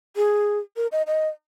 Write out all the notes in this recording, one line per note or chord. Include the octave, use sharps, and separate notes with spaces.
G#4
A#4
D#5
D#5